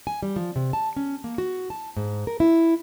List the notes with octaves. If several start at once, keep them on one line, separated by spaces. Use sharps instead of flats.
G#5
G3
F3
C3
A5
C#4
A#3
F#4
A5
G#2
A#4
E4